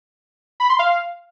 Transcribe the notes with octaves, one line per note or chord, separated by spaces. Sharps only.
B5
C6
F5